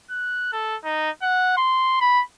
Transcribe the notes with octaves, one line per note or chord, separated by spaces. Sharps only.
F#6
A4
D#4
F#5
C6
B5